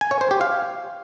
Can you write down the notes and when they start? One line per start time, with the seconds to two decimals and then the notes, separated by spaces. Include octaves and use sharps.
0.01 G#5
0.11 C#5
0.21 C5
0.31 G4
0.41 F5